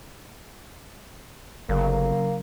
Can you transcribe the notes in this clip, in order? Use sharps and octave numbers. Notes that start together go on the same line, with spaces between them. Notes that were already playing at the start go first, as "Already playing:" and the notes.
G1 C#3 F#3 A#3